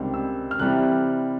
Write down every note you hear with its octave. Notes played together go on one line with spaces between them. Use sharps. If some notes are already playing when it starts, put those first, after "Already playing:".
Already playing: C#2 C3 D#3 G3 C4
E6
F6
C3 E3 G3 C4 F#6